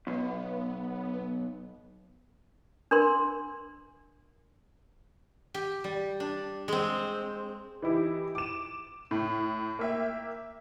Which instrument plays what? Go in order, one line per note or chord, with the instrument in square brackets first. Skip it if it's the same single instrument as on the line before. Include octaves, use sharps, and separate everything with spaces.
[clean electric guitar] B1 [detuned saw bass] B3
[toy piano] D4 A#4 C6
[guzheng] G4
G3
D4
G#3 C4
[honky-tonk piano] E3 D#4 E4 G4
D6 E7
A2
A#3 E5 G5